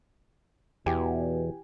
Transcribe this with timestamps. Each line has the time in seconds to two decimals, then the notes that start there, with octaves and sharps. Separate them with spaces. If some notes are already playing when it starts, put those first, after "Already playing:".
0.86 E2 B2 E3 G4 G5 G#5